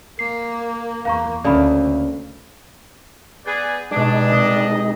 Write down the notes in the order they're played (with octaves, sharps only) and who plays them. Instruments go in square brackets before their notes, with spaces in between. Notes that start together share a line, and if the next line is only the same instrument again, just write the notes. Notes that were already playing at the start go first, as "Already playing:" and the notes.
[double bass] A#3 [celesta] C7
[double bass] E2 A#3 [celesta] F5 A#5 C#6
[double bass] D2 [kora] C#3 A3 A#3 [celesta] D5 B5
[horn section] B3 G#4 [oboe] D5 [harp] G6
[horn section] G2 D4 [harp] B2 D5 [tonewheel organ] G#3 D#4 [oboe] G#4
[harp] C2 [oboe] D#5